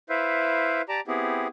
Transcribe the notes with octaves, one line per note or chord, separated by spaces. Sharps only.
E4 B4 C5 E5 F5
G4 D5 A5 A#5
B3 C4 E4 G4 G#4